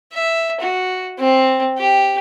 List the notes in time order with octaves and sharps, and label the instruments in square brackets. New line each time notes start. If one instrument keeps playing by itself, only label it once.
[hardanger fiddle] E5
F#4
C4
G4